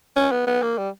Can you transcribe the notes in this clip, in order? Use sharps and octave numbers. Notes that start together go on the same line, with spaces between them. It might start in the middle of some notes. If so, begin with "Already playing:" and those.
C#4
B3
B3
A#3
G3